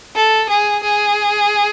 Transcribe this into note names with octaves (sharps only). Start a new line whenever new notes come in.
A4
G#4
G#4